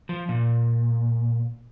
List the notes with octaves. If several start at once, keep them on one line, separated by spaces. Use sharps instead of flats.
F3
A#2